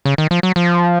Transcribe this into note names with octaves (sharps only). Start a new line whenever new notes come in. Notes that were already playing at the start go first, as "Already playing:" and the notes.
C#3
D#3
F3
F#3
F3